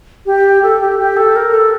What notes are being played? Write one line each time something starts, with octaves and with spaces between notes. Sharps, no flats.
G4
A4
G4
G4
A4
A#4
A4